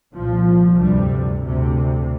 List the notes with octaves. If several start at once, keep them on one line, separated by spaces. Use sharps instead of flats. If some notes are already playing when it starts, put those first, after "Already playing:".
C2 A#2 F3
D2 G2 C3 G3
D2 C3